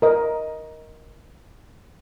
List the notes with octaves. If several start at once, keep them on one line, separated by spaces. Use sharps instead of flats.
A#4 D#5